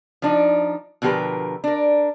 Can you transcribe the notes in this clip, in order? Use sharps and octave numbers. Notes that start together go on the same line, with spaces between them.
F3 D4 D#4
B2 D3 F3 G4 A#4 B4
D4 A#4